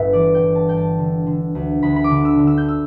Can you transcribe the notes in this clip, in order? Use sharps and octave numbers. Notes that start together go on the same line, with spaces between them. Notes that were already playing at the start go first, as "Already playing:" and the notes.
Already playing: G1 G2 B4 E5
E3 D5
G5
G1
A5
G2 G5
A5
D3
D3
D2
D2 B5
B5
D6
D3
E6
D3
E6
G6
E6